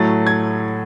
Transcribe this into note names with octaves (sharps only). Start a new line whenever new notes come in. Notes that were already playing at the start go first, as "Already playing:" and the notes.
Already playing: A2 F#3 A3 A6
G#6